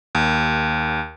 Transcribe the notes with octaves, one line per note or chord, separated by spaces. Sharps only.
D#2